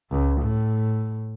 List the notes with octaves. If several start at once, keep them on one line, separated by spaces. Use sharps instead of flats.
C#2
A2